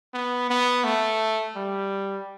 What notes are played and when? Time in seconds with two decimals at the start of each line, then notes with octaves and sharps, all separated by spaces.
0.14 B3
0.50 B3
0.84 A3
1.56 G3